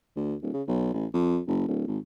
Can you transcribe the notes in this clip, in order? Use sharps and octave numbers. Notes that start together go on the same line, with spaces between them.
D2
D1
C#3
B1
A1
F2
F#1
D1
G#1